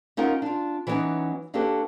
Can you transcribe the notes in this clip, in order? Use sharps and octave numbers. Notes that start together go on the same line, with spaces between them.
C#4 D#4 F4 A#4 F#5
D4 F4
E3 F#3 G3 B3 C#4 D#4
A#3 D4 F#4 G4 A4 B4